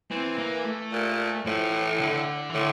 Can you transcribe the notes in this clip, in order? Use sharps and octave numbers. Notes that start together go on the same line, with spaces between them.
E3 C4
A#3
A3
A#2
A2 F3
E3
D3
E3
A2 D3